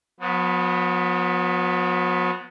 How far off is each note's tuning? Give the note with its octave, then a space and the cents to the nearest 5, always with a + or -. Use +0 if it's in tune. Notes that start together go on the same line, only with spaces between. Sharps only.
F#3 -45 B3 +0